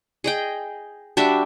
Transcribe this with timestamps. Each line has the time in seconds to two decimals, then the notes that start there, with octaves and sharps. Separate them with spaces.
0.24 G#4 D#5 G5
1.17 G3 D4 F#4 E5